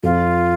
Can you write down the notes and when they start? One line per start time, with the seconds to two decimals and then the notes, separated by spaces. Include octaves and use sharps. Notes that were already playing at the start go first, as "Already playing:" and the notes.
0.03 F2 F4